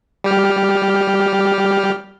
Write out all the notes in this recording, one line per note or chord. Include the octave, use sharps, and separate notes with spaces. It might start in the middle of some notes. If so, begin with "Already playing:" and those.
G3 G4 F6